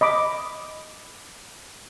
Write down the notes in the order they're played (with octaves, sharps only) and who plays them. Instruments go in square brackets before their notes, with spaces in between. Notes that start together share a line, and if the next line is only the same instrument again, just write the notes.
[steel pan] D#5 B5 D6